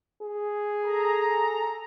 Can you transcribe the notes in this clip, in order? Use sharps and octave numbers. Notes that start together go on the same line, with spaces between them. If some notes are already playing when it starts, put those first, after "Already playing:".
G#4
A4 A#5